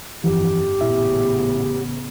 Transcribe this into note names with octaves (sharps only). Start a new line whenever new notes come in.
G1 F2 E3 F3 G4
A1 A#2 C#3 B3 E4 E5